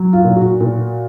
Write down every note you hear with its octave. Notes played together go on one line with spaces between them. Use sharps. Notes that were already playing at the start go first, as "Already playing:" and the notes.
Already playing: F#3
F4
A#2
F#4
A#2